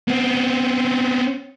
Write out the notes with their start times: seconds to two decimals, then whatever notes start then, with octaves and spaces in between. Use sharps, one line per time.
0.08 B3 C4